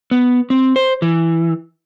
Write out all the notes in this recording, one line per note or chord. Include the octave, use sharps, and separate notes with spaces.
B3
C4
C5
E3